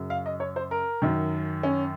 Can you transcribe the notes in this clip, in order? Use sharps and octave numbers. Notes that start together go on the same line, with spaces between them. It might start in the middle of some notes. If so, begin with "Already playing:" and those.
Already playing: F#2 C#3
F5
D#5
C#5
C5
A#4
F#2 D#3
C#4